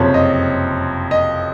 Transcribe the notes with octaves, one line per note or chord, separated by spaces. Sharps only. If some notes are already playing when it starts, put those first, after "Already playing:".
Already playing: F#1 F2 C3 F3 C#5
D#5
D#5